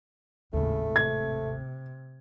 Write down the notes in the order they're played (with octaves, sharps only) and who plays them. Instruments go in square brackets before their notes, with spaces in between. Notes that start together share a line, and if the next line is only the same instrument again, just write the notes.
[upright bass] G#1 D#2 [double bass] A2 C#3 [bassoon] A3
[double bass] C3 [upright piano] G#6